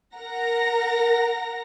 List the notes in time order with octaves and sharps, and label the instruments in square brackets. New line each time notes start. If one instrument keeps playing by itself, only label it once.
[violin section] A#4 F#5 A#5 A#6